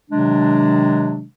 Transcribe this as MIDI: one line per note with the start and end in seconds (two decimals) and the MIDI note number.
0.11 1.24 48
0.11 1.24 51
0.11 1.24 54
0.11 1.24 56
0.11 1.24 62